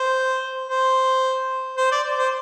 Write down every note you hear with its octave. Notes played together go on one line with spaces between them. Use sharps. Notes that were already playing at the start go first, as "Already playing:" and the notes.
Already playing: C5
C5
C5
D5
C5